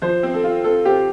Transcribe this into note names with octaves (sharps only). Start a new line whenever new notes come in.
F3 C5
C4
A4
F4
C4 A4
C4 G4